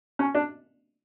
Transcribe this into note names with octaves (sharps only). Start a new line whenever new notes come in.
C#4
D4